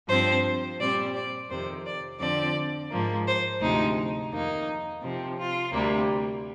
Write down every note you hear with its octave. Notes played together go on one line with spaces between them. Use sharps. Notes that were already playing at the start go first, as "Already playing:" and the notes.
G2 F3 C4 C5
A#2 G3 C4 D5
D5
F2 C3 D#3 C5
D5
F2 D3 F3 C4 D5
G#2 F3 A#3
C5
D2 C3 F3 G#3 D#4
F2 D#3 A#3 D#4
C3 F3 C4
F4
D2 C3 G3 A#3